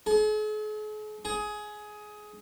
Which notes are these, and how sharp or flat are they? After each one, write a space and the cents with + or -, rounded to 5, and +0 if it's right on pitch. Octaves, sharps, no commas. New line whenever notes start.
G#4 +45
G#4 +15